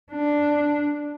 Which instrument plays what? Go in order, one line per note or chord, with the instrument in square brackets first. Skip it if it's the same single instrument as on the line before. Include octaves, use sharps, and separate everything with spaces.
[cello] D4